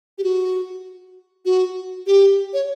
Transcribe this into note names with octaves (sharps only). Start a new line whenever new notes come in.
G4
F#4
F#4
G4
C#5